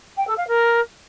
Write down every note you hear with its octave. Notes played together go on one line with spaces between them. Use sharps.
G5
A4
F5
A#4